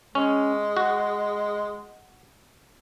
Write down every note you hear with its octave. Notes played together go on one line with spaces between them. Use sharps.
G#3 C#4
F#4